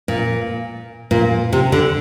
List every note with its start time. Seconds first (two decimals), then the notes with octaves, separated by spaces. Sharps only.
0.08 A#2
1.11 A#2
1.52 C3
1.72 D3